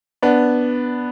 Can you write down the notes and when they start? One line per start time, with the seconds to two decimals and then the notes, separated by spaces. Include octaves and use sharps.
0.22 B3 D4